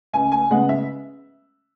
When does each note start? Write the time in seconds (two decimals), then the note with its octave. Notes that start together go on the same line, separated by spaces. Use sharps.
0.13 C#2 G#5
0.32 G#5
0.51 C#3 G#3 B3 F#5
0.69 E5